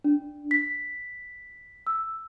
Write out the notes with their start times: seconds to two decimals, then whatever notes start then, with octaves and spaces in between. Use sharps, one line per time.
0.04 D4
0.51 B6
1.87 E6